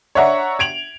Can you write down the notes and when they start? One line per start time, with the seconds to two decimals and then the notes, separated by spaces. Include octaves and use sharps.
0.15 C#5 D5 E5 F#5 A#5 C#6
0.59 G#6 D7 F7 F#7